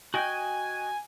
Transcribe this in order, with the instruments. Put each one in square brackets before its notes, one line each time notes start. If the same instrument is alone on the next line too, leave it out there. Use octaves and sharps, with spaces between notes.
[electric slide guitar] F#4 D#5 G5 [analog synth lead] G#5